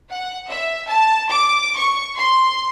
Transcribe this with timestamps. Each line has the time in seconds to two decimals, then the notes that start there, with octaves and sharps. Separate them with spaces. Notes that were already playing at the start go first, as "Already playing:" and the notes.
0.12 F#5
0.51 E5
0.89 A5
1.31 D6
1.77 C#6
2.18 C6